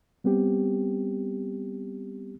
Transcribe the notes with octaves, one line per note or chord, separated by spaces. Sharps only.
G3 B3 C4 G4